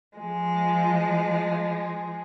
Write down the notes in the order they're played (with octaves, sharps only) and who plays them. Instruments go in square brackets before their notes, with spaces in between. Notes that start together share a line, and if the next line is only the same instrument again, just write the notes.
[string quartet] F3 G#3